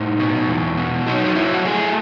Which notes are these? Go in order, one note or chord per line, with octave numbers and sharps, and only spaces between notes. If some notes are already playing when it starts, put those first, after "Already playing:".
Already playing: A2 D#4
B2
E2
B2
F#3 D#4
D#4
F#3 E4
F#4
A3 G#4